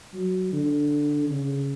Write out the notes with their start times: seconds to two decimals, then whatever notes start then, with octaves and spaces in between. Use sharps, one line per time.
0.14 F#3
0.53 D3
1.30 C#3